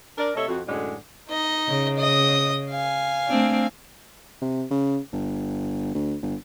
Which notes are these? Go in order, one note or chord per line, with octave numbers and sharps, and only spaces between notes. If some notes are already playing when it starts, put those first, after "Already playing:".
D4 A#4 D5
C3 A3 A4 C#5 D#5 E5
F2 F#4
F#2 A2 D3 G#3
D#4 D#5
C#3
D#5 D#6
F5 G#5
A3 C4 D4
C3
C#3
G1
D2
G1